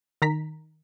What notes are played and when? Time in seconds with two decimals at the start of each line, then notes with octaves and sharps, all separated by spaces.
0.22 D#3 A#5 B6